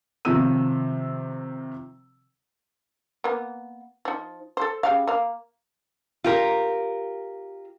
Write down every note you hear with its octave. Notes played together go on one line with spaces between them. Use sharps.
C3 D#3 F3 E6 D#7
A#3 B3
F3 D#4
A4 C5
C#3 G4 F5
A#3 F5
F4 G4 A#4